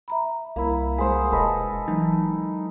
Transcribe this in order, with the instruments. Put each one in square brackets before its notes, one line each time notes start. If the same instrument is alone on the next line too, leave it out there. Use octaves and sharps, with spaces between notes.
[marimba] E5 A#5 B5
[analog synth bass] C2 [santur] A#3 E4
[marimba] G#3 [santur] G#4 C5 F#5
[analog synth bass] E1 [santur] A4 B4 D#5
[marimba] E3 F#3 G#3 [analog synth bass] D#4